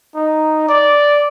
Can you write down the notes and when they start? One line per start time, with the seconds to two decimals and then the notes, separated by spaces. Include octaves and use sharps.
0.15 D#4
0.68 D5